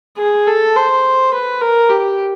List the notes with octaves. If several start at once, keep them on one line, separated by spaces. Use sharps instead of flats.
G#4
A4
C5
B4
A#4
G4